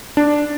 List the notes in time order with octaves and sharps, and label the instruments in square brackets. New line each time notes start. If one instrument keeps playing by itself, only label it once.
[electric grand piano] D4